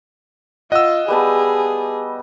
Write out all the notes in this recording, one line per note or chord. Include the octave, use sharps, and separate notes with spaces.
F4 D#5 F#5 E6
G3 B3 G#4 A5